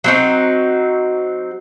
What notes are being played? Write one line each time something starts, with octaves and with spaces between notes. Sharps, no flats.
F#3 C4 D#4 F#4